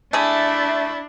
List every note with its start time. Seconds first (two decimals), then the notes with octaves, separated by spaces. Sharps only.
0.13 A3 D4 E4 G#4